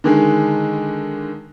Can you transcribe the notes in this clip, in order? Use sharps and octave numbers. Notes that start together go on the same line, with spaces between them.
D3 D#3 G#3